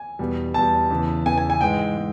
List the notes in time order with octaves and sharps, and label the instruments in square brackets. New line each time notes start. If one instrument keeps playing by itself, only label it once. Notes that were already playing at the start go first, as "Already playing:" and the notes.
Already playing: [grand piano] G#5
E2 B2 G3
E2 B2 G3 A5
E2 C#3 E3
E2 C#3 E3 G#5
G#5
G#5
G#2 E3 G#3 G5
G#3